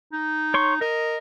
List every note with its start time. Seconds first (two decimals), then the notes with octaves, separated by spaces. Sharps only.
0.12 D#4
0.54 C#5 C6 C#6
0.81 A#4 D#5